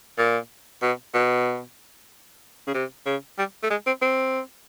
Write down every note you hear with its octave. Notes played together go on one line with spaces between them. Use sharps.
A#2
B2
B2
C#3
C3
C#3
G3
A3
G#3
C4
C4